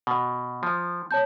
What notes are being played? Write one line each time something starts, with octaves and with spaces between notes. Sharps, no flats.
B2
F3
C#5 A5 G6